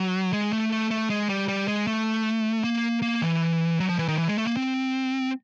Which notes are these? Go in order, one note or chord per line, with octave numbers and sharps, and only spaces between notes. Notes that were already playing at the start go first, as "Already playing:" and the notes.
Already playing: F#3
G#3
A3
A3
A3
G#3
G3
G3
G#3
A3
A#3
A#3
E3
F#3
F3
E3
D#3
E3
G#3
A3
A#3
C4